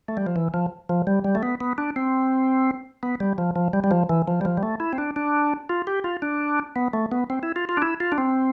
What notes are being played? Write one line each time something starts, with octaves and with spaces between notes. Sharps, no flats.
A3
G3
F3
E3
F3
F3
G3
G3
A3
B3
B3
D4
C4
B3
G3
F3
F3
G3
G3
F3
E3
F3
G3
F3
G3
A3
E4
C4
D4
D4
F4
G4
F4
D4
B3
A3
B3
C4
E4
F4
F4
D4
E4
F4
D4
C4